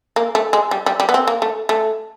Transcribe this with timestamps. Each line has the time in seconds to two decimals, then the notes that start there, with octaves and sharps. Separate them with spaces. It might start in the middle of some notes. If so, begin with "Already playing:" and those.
0.16 A#3
0.35 A3
0.53 G#3
0.71 G3
0.86 G3
1.00 G3
1.09 B3
1.14 C4
1.27 A#3
1.42 A3
1.69 A3